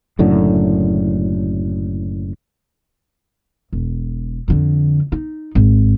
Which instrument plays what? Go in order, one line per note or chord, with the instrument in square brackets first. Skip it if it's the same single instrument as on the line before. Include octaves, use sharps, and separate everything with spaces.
[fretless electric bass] F#1 F#2 A2 D3
[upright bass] E1
F2 D3
D#4
G#1